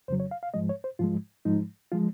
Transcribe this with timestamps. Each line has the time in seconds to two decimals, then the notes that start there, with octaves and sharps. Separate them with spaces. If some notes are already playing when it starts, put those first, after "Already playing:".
0.08 F2 C#3 F#3 C5
0.20 C#5
0.31 F5
0.43 F5
0.54 G#2 F3 G#3 D#5
0.69 C#5
0.84 C5
0.99 G#2 F3 G#3 F4
1.45 G#2 F3 G#3 D#4
1.92 F3 G#3 F4